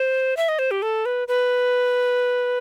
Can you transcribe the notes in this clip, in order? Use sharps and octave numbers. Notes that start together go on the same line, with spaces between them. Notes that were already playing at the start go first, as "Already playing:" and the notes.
Already playing: C5
E5
D#5
C5
G4
A4
B4
B4